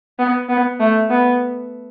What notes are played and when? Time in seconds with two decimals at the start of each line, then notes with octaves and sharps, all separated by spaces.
0.19 B3
0.49 B3
0.80 A3
1.10 B3